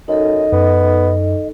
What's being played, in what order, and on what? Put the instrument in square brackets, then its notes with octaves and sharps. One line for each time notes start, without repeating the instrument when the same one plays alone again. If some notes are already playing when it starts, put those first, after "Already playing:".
[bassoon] F#2 [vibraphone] D#4 A4 [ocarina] D#5
[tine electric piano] F#2 [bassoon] B3